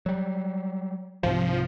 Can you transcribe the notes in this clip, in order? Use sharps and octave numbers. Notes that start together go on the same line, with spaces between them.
F#3 G3
C2 G#2 C3 F3